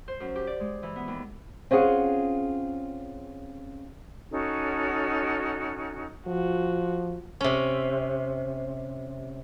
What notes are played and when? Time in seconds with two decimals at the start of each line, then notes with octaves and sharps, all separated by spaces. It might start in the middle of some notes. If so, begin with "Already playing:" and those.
0.08 C5
0.20 F#2
0.36 G4
0.47 D5
0.60 G#3
0.83 E3
0.96 B3
1.08 D#2
1.71 C4 C#4 F4 G#4 F#5
4.32 C#4 D#4 F#4 A4
6.27 F3 F#4
7.41 C3 C#4